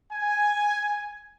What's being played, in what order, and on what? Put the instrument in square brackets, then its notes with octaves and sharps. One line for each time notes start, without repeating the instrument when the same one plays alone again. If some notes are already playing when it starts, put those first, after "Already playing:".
[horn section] G#5